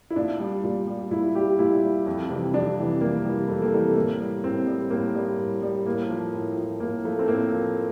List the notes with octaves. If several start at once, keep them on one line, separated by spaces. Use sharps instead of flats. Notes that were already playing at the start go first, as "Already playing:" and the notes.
E4
A#2 D4
G3
A#2
G3
A#2 E4
G3 G4
A#2 E4
G3
F2
C3 E3 G3
F2 D4
C3 E3 G3
F2 A#3
C3 E3 G3
F2 A3
A#3
C3 E3 G3 A3
A2 A#3
G3
A2 C4
G3
A2 A#3
G3
A2
G3
A2 A#3
F3
A2
F3
A2 A#3
F3 A3
C4
A2 A#3
F3